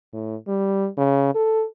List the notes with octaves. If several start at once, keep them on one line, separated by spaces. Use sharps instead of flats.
A2
G3
C#3
A4